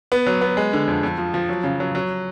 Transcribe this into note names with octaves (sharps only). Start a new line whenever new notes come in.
B3
F#3
B3
G#3
D3
F2
F2
F3
F3
F#3
C#3
F#3
F#3